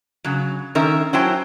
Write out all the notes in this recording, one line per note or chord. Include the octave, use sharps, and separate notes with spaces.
C#3 F#3
D#3 C#4 A#4 E5
F#3 C#4 E4 C5 G5 A5